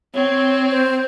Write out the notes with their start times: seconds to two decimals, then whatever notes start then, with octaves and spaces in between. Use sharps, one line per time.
0.15 C4 C#5
0.71 C5